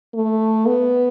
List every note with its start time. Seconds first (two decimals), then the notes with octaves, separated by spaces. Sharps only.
0.14 A3
0.66 B3